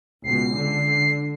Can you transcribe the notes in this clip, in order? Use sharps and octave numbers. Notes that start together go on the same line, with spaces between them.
C#2 B2 C7
D3